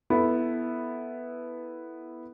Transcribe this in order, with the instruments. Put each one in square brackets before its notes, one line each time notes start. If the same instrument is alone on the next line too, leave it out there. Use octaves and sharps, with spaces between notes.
[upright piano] B3 E4 A4